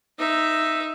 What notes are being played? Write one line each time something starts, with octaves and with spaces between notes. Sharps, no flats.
D#4 E5